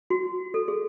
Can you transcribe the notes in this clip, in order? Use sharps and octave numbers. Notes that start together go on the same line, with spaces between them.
F#4
A4
G#4